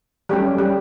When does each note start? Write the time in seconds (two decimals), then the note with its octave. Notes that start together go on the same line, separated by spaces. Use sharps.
0.29 F#3 G3 A3 C#4 G4
0.58 G3 G4